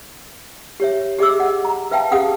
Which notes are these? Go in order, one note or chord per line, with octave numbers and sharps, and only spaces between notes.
G4 C#5 E5
G4 G#4 D#5 E5 D6 E6
D#5 F#5
A#5
B4 E5 F5 G5 A5
C#4 G4 G#4 F5 F#5 D#6